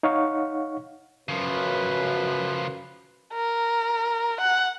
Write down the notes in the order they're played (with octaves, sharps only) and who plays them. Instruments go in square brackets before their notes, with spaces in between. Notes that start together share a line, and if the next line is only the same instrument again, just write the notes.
[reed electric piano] D#4 C#5 F5 F#5 C#6
[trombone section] F#2 [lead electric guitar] C#3 F3 [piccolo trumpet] B4
[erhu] A#4
F#5